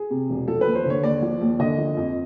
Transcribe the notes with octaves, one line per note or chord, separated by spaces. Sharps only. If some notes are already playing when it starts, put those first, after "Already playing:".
Already playing: G#4
C3
E1
F3 A4
D#2 B4
C5
D3 C#5
D#2 D5
F3
D#2
D3 D#5
F3
F2